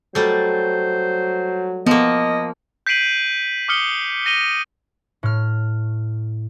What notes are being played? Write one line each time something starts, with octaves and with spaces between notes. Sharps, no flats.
F#3 G3 A3 C5
F3 A#3 B3 D#5
G6 B6 C7 D7 D#7 F#7
D6 D#6 F6 C#7 G7
A#6 D#7 F7 G7
A2 F6